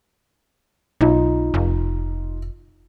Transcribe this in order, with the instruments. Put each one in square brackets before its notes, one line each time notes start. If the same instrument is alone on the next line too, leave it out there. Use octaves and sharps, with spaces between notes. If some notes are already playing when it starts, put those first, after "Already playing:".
[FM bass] B1 [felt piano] D#4 F4
[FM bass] F1